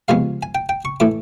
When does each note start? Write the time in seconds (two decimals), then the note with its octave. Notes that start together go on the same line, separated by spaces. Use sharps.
0.08 C#2 C3 F3 G#3 B3 F5
0.43 G#5
0.55 G5
0.69 G5
0.85 C#6
1.00 A2 E3 A3 D6